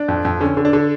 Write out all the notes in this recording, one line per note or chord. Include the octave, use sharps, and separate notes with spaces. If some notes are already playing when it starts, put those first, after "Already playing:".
Already playing: D4
F2
F2
D3 C#4
D3
D4
D3